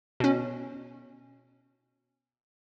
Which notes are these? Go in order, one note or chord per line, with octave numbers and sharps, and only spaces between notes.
B2 C#4